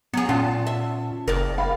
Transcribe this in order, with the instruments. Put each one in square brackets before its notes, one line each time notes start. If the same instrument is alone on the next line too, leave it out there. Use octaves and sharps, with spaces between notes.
[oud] F#3 G#4 [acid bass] B3
[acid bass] A#2 [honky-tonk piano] C#4 F#5 A5 [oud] F4
[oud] E5
[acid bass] F#1 [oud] A#4 D5
[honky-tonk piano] F5 B5